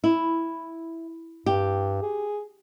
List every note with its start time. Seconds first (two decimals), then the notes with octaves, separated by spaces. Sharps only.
0.04 E4
1.46 G2 G4
2.02 G#4